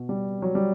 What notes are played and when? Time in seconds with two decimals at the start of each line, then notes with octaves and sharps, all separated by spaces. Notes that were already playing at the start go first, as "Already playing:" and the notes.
Already playing: B2
0.09 G3
0.42 F#3
0.55 G3